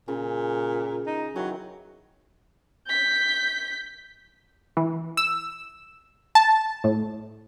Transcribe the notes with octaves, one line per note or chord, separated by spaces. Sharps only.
A#2 C#3
D#4
D#3 E3 F#3
G6 B6
E3
E6
A5
A2